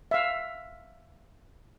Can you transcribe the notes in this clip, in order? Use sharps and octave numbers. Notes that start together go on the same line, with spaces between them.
E5 F5